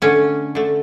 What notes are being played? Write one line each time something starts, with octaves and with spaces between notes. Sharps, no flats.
D3 A3 C#4
D3 A3